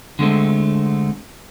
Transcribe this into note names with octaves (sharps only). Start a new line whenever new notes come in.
D3 G#3 A3 C4